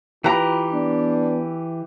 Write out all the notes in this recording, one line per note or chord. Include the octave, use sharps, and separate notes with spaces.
E3 F4 G4 B4 A#5
B3 D4